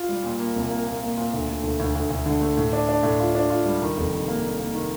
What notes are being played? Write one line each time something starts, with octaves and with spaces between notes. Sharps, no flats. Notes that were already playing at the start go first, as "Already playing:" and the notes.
Already playing: F4
G3
A#2
A#3
C2
A#3
A#2
A#3
A#2
D2
A3
D2
D2
D2
D2
D3
A3
A2
D4
D4
A2
F4
D4
F4
G3
D#3
F1
D#3
A#3
A#3
A#3
D#3